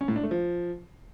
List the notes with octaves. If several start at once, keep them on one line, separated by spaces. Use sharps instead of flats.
C#4
A2
D4
A3
F3